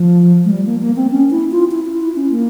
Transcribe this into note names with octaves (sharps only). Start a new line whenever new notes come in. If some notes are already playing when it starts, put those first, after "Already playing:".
Already playing: F3
G#3
G3
A#3
A#3
C4
C#4
E4
F4
E4
E4
E4
C#4
A#3